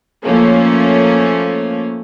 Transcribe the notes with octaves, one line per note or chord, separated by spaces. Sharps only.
F3 A3 A#3 C#4